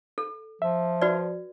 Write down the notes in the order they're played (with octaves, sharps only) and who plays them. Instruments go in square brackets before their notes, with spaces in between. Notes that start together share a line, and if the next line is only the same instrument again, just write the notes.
[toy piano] A4
[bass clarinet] F3 [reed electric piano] E5
[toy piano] F#4 B4 D5